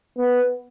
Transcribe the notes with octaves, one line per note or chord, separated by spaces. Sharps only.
B3